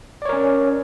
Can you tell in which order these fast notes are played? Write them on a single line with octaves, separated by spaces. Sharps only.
D5 C#5 A#4 C#4